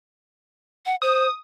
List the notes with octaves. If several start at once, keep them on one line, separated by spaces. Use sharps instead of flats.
F#5
C5 D#6